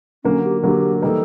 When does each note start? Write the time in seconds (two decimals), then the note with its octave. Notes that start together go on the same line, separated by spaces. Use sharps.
0.24 D3 F#3 A#3 C#4
0.44 G4
0.63 D3 F#3 A#3 G4
1.02 E3 G3 A#3 D#4 A4